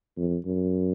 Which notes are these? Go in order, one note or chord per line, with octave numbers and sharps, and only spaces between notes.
F2
F#2